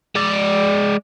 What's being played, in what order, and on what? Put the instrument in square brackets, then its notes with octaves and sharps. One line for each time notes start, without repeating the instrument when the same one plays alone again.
[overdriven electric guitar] G#3 D5